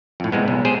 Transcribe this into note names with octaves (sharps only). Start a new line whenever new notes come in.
F2 A2
C3 G3 G#3 B3
B1
G4 G#4 C5 G5